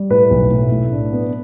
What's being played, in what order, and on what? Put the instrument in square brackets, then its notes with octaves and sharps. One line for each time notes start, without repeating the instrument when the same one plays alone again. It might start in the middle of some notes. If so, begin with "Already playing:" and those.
Already playing: [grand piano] G3
A2 B4
B1
A2
A2
D4
B3